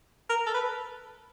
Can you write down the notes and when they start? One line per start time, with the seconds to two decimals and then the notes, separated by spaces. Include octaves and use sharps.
0.30 A#4
0.46 A4
0.54 B4